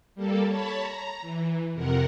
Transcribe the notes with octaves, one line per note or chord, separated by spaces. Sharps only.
G3 A#3 A4
C#5 A5 B5
A#5
E3
F2 C3 A#4 F#5